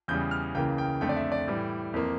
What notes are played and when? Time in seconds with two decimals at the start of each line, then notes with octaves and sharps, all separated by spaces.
0.08 E2 C#3 G3 G6
0.31 F6
0.55 C#2 C#3 E3 A#3 G5
0.78 G5
1.01 F2 D3 A3 G5
1.09 D5
1.16 E5
1.32 D5
1.48 A2 E3 G3
1.94 F2 E3 A#3